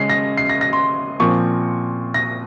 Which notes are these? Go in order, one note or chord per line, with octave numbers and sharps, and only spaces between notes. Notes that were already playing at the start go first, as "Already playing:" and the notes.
Already playing: C#3 G#3 C#4 C7
A#6
C7
A#6
A#6
C6
A#2 F3 C4 C#6
A#6